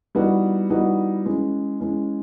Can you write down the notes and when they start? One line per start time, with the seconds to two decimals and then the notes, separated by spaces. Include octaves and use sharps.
0.15 E3 G3 B3 D#4 F#4
0.70 E3 G3 B3 D#4 F#4
1.26 E3 G#3 C#4
1.80 E3 G#3 C#4